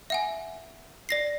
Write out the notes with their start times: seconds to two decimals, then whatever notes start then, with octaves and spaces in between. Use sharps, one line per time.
0.10 E5 F#5 G#5
1.09 D5 A#6 C7